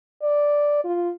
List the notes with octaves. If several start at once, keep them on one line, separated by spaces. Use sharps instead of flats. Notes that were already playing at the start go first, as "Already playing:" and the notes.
D5
F4